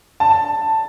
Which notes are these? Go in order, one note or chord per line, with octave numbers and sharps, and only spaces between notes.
A5